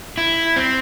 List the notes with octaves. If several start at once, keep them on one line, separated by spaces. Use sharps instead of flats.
E4
C4